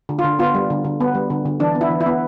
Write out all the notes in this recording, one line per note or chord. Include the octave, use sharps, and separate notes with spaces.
D3
F4
D3
B3 F4
G3
D3
D3
B3
G3
D3
D3
E3 D4
B3
E4
E3
E4
B3